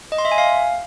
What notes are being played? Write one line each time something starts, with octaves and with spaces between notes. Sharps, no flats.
D#5
C6
E5
G#5
F5